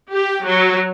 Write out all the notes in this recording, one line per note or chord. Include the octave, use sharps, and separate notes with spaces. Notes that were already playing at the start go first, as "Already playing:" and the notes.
G4
F#3